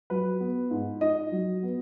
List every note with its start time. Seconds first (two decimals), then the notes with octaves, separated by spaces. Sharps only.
0.10 F#3 B4
0.40 B3
0.71 G#2
1.01 D#4 D#5
1.32 F#3
1.63 B3